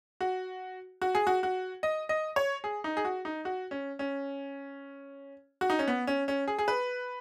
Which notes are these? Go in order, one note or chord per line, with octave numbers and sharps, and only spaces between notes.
F#4
F#4
G#4
F#4
F#4
D#5
D#5
C#5
G#4
D#4
G#4
F#4
D#4
F#4
C#4
C#4
F#4
D#4
C#4
B3
C#4
C#4
G#4
G#4
B4